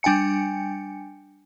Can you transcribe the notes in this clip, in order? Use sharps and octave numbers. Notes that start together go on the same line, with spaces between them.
G3 D4 G5 G#5 C#7